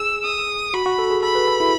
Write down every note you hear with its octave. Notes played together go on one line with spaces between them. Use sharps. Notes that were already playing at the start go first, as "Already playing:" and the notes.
Already playing: G#4 E6
D#6
F#4 B5
F#4
A4
G#4
A4 B5
B4
A4
E4